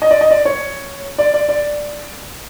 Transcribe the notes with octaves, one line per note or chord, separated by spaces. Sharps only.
D#5
D5
D#5
D5
C#5
D5
D5
D5